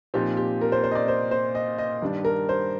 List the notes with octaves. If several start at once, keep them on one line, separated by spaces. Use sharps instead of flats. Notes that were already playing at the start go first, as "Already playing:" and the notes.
A#2 F3 C4 D#4 G4
G4
A#4
C5
C5
D#5
D5
C5
C5
D#5
D#5
G2 D#3 G3 D4
A#4
C5